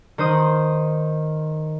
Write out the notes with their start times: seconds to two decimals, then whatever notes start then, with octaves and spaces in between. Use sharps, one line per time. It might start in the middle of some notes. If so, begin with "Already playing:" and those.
0.18 D#3 C5 D#6